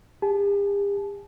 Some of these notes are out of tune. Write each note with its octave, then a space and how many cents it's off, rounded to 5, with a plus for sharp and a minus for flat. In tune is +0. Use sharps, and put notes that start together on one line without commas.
G4 +45 A5 -35